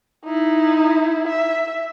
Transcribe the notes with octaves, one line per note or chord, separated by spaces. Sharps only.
D#4 E4
E5